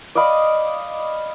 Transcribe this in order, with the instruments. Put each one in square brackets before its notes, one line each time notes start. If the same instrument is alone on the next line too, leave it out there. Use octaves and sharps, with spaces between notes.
[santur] D5 D#5 F5 B5